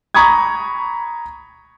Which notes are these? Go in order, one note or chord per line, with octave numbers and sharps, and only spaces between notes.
A#5 B5 C#6 D#6 G#6